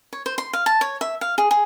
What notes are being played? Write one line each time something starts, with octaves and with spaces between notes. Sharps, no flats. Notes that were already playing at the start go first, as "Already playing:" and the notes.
C#5
C5
C6
F5
A5
C#5
E5
F5
G#4
G#4